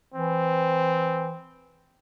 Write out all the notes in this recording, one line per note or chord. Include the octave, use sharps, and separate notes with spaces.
E3 C4